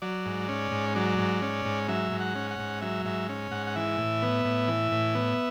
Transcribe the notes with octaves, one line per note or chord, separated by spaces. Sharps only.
F#3 D5
G#2
C#4
G#2
F#3 D5
G#2
C#4
G#2
F#3 E5
G#2
F#5
C#4
F#5
G#2
F#3 E5
G#2 E5
C#4
G#2 F#5
F#5
E3 E5
A2
B3
A2
E3
A2
B3